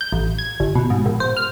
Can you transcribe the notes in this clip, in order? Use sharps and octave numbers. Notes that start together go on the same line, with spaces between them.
G6
A1
G#6
G1
B2
G#2
A#1
C5
F6